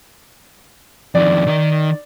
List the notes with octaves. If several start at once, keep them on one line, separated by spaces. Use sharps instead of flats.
F2 D#3 D5
D#3 D#4